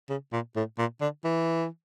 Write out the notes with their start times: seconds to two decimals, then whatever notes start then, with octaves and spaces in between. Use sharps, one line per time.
0.09 C#3
0.33 A#2
0.56 A2
0.78 A#2
1.01 D3
1.24 E3